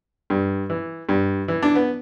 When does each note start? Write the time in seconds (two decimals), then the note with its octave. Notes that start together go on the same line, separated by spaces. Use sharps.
0.30 G2
0.70 E3
1.09 G2
1.48 E3
1.63 D4
1.75 B3